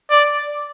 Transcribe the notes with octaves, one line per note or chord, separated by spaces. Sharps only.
D5